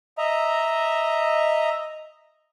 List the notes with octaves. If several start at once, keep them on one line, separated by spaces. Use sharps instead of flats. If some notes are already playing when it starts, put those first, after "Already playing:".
D#5 E5 A#5